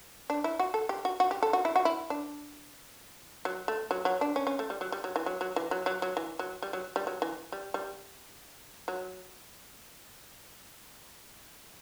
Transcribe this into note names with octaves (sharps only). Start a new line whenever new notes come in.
D4
E4
F#4
A4
G4
F#4
F#4
G4
A4
F#4
E4
F#4
E4
D4
F#3
A3
F#3
F#3
D4
C#4
C#4
A3
G3
F#3
G3
F#3
E3
F#3
F#3
E3
F#3
F#3
F#3
E3
F#3
G3
F#3
G3
F#3
E3
G3
G3
F#3